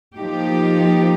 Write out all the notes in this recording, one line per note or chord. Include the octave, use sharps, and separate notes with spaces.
F3 A#3 D#4 G4